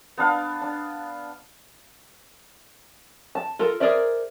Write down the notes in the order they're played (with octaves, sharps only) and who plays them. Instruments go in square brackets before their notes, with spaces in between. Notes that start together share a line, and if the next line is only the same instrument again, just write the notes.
[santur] B3 D4 F5
D4
[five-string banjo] A5
F4 A4 A#4
G#4 A#4 C5 D5 E5